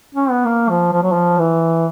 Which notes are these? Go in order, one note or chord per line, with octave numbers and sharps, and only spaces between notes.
C#4
B3
A#3
F3
F3
F#3
F3
E3